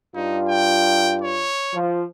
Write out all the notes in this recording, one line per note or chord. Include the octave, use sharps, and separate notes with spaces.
G2 D#4 F4
G5
C#5
F3